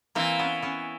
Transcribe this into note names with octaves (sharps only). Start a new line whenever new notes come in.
E3 A#3 C4
B3 C#4
B3 C#4